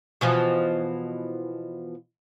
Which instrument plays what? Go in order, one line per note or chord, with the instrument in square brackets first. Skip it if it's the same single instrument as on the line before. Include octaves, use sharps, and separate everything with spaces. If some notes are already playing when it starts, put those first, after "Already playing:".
[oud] B2 E3 F3